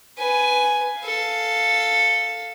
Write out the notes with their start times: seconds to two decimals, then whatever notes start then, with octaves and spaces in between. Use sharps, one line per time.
0.19 B4 G#5
1.01 A4 F5